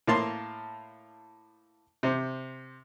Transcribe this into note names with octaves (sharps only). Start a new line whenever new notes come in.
A2 A#3 F5 A5 C6
C3 C5